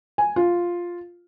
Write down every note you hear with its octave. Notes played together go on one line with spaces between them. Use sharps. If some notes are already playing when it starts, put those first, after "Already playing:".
G#5
F4